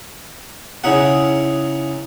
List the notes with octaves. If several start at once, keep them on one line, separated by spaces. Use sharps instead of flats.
C#3 D#4 E4 G#4 F#5